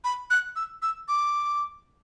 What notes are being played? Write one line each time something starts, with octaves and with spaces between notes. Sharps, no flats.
B5
F#6
E6
E6
D6